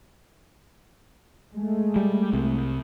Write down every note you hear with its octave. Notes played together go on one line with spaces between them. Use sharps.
G#3 A3
G3
C2 C3